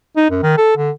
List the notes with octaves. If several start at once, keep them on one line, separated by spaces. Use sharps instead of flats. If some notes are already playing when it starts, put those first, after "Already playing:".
D#4
F#2
D#3
A4
D3